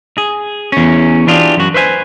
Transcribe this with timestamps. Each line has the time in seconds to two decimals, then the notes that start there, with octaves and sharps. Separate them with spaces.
0.18 G#4
0.72 E2 C#4
1.27 E3 D4 F4 G4 G#4
1.57 F#2 F#4
1.74 B4 C5 E5 G#5